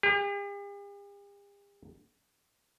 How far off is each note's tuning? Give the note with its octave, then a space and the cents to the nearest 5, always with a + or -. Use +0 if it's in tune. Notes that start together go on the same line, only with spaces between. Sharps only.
G4 +45